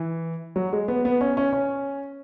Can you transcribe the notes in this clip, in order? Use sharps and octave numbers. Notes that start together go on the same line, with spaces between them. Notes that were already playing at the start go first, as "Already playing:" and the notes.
Already playing: E3
F#3
G#3
B3
B3
C#4
C#4
C#4